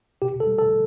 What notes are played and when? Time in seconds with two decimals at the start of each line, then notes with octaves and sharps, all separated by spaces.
0.22 B2 G4
0.40 A4
0.47 G3
0.59 A4